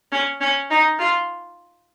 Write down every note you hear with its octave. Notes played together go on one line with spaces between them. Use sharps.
C#4
C#4
D#4
F4